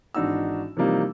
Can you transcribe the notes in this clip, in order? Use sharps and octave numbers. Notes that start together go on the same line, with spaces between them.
G#1 E3 D4 D#4 F#4 E6
C3 E3 F3 G3 A#3 D#4